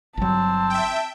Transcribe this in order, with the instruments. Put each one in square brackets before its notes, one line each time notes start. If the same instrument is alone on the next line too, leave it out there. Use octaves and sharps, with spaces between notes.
[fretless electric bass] G1 F#3 [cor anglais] C4 [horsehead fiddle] A5
[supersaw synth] E5 G5